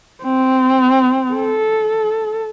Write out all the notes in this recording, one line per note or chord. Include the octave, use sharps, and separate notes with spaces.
C4
A4